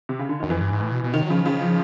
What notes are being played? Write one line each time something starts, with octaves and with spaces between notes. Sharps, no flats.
C3
C#3
D3
F#2 D#3
F2 E3
G2
G#2
A2
B2
B2
C3 D#3
F#3
C#3 F3
C#3 F3